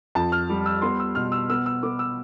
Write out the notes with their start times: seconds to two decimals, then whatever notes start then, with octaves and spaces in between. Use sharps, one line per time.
0.15 F2 A5
0.32 F6
0.49 G3
0.66 E6
0.82 B3 C6
1.00 E6
1.15 B2 F6
1.32 E6
1.49 B3 E6
1.66 E6
1.83 B3 D6
1.99 E6